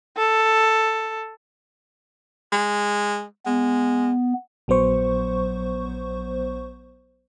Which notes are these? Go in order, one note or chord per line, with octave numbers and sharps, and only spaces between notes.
A4
G#3
G#3 B3
A#1 F#3 B3 C5 C#6